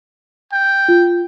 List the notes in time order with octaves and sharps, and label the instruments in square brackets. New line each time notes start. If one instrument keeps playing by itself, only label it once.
[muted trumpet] G5
[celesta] F4